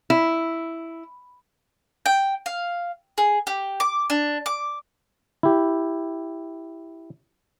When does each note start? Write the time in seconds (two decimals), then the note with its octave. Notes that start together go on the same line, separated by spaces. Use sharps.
0.10 E4
2.06 G5
2.46 F5
3.18 G#4
3.47 G4
3.80 D6
4.10 D4
4.46 D6
5.43 E4 G4